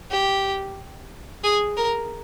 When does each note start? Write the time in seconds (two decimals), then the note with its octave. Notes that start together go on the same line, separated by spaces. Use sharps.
0.11 G4
1.44 G#4
1.77 A#4